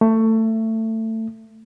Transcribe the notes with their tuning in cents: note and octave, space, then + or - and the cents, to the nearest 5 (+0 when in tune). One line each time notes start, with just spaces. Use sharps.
A3 +20